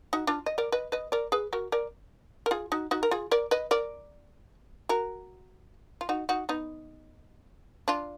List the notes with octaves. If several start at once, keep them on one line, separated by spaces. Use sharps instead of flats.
D#4 F#4
D4 F4
D#5
A#4 D5
B4 D#5
B4 D#5
A#4 D5
G#4 B4
F#4 A#4
A#4 D5
A#4
F4 G#4
D#4 F#4
D#4 F#4
A#4
F4 G#4
A#4 D5
B4 D#5
A#4 D5
F#4 A#4
F4
D#4 F#4
D#4 F#4
B3 D#4
D4 F4